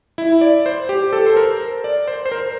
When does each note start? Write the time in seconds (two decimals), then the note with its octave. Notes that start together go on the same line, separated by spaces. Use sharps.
0.18 E4
0.41 D5
0.66 C5
0.89 G4
1.13 A4
1.26 C5
1.37 A#4
1.84 D5
2.08 C5
2.26 C5
2.32 A#4